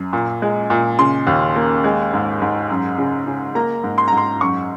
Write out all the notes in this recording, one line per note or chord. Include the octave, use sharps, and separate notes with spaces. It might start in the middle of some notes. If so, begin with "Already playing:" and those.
Already playing: F#2
A#2
G#3
A#2
C#3 C6
D#2
A#3
G#3
G#2
G#2
F#2
C#3
C#3
A#3 A#5
G#2
C6
G#2 A#5
C6
F#2 C#6